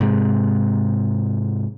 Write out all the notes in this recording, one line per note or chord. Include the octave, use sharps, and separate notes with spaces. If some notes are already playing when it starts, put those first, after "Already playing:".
G#2 C3 G#3